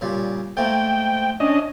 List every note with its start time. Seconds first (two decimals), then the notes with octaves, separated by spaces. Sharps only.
0.01 A#2 C#3 G3
0.57 G#2 A3 A#3 G5
1.40 C#4 D4 D#5